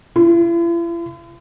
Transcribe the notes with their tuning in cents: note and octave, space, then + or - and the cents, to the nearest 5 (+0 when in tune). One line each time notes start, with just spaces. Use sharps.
E4 +45